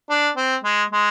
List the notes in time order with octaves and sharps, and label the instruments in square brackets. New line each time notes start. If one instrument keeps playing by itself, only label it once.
[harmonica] D4
C4
G#3
G#3